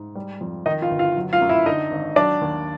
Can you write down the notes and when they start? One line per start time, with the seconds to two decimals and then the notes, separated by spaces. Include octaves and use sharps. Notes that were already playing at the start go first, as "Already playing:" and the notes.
Already playing: G#2
0.16 G3
0.41 F2
0.66 D#3 D#4 D#5
0.82 F4 F5
0.91 G1
0.99 F4 F5
1.17 F#3
1.33 F4 F5
1.41 F#2
1.49 E4 E5
1.66 D3 D#4 D#5
1.91 G#1
2.16 F#3 D4 D5
2.41 D#2